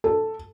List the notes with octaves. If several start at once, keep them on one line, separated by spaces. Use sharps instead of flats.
A4